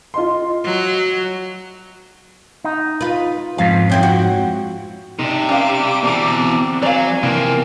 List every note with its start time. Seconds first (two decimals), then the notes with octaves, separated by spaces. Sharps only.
0.14 F4 D#5 C6
0.64 F#3
2.64 D#4
3.01 F4 B4
3.58 F2 G#2 F3 F5
3.90 F#2 C4 E4
4.03 F#4
5.19 C3 D4 D#4
5.49 C#4 D5 F5 G5 D6
6.04 B2 E3 C4 A#5
6.83 F#3 D5 F5 G#5
7.23 C3 E3 F3 A#3 C4